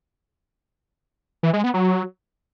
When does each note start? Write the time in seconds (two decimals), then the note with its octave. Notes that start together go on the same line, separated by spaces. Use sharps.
1.43 E3
1.53 G#3
1.64 B3
1.74 F#3